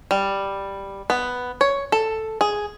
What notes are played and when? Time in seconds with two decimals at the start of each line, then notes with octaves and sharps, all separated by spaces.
0.11 G3
1.10 B3
1.61 C#5
1.92 A4
2.41 G#4